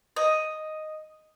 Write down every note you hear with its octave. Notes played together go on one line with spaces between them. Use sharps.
D#5